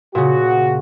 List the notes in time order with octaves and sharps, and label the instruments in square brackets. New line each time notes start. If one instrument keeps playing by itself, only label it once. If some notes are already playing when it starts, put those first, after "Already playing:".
[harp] A#2 C#3 [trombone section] F#4